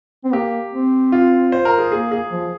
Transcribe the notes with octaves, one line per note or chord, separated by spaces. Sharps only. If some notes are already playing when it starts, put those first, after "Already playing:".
C4
A#3 G4
C4
F4
C5
A#4
G#4
A#3 G#4
G#4
F3